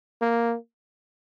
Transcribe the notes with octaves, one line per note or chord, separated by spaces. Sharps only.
A#3